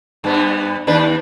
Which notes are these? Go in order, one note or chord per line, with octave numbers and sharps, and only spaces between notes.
G2 B3
D#2 D4 B4